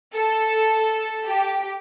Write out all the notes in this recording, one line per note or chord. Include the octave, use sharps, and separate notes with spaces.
A4
G4